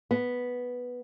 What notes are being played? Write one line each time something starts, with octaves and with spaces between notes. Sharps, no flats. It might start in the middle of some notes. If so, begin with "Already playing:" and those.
B3